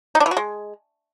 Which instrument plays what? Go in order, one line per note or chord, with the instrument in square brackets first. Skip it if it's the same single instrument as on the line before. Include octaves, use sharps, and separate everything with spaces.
[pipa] D#4
D4
E3
F#4
G#3